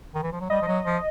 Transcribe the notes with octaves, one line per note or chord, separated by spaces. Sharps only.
D#3
E3
F3
F#3
G3 D#5
F3
F#3
F3